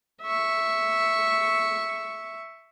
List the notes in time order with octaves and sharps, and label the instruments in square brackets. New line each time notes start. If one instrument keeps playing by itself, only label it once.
[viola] E5 C#6